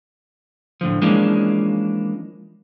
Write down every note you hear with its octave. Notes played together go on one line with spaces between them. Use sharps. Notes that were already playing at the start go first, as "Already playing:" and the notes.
A2 D3 F3
E3 F3 G#3 A#3 C#4 D4